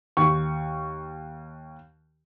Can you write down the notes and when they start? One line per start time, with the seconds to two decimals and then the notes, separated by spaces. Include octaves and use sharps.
0.17 D#2 C#6